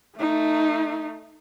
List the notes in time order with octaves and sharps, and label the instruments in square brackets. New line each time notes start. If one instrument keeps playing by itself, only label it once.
[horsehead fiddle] A3 D#4